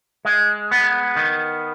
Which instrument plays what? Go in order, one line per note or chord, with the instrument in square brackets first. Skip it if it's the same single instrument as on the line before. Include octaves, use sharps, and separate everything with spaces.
[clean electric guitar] G#3
B3
D#3